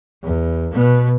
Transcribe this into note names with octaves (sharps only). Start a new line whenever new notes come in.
E2
B2 B3